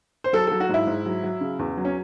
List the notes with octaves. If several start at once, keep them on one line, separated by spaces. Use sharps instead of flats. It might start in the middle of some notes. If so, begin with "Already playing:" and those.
C5
F#3 A4
F#3 A4
F#4
G#2 E4
G#2
F#3
F#3
C#3
E2
F#3
C#4